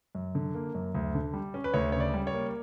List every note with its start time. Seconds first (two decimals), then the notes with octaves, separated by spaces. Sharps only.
0.15 F#2
0.35 D3
0.54 A#3
0.75 F#2
0.95 D2
1.15 D3
1.33 G3
1.54 C#4
1.64 B4
1.74 D2 C#5
1.92 C#3 C#5
2.00 D5
2.14 G3
2.27 C#5
2.34 A#3